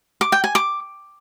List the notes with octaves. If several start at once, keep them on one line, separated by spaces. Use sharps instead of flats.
D6
G5
G#5
D6